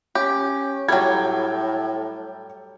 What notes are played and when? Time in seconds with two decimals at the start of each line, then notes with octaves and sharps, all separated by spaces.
0.15 C#4 G4
0.88 A2 F#3 G3 G5 G#6